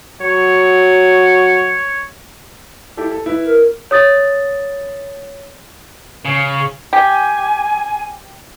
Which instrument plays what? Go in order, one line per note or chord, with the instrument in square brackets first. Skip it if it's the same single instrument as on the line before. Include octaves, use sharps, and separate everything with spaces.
[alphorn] F#3 [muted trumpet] C#5
[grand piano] E4 G4 A4
A4
E4 B4
[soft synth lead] A#4
[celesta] C#5 D#6 A6
[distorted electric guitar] C#3
[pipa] G4 [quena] G#5